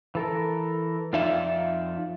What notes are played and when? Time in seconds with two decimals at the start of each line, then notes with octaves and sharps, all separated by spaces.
0.15 E3 A4 A#4
1.13 F2 D#4 F4 D5 E5